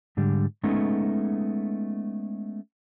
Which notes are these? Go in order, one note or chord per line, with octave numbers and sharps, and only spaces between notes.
G#2 D3 G3
G#3 A3 B3 C#4 D#4